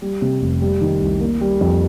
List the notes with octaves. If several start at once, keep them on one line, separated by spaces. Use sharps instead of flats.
G3
C3
F1
G3
D#3
C2
A#3
G3
F2